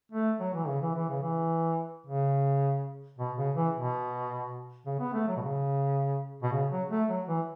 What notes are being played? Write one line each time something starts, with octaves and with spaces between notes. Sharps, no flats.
A3
F#3
E3
C#3
E3
E3
C#3
E3
C#3
B2
C#3
E3
B2
C#3
B3
A3
F#3
B2
C#3
B2
C#3
F#3
A3
F#3
E3